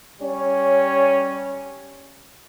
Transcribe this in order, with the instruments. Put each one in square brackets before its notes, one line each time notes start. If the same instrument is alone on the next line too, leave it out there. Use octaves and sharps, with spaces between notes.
[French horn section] G3 C#4 C#5